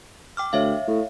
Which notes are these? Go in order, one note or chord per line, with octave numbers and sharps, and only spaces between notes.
G5 D6 F6
D2 C#5 E5 F5
A2